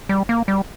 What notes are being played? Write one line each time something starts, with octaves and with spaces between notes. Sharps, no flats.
G3
A#3
G3